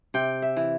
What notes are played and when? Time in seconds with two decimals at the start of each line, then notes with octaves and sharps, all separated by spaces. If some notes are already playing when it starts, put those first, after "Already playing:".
0.14 C3 G5
0.42 E5
0.57 E3